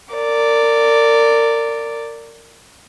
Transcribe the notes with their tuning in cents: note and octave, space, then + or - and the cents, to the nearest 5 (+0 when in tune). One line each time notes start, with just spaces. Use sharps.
A#4 -25 D5 -5